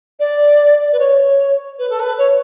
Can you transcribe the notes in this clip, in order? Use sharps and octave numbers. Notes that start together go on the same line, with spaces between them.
D5
B4
C#5
B4
A4
B4
C#5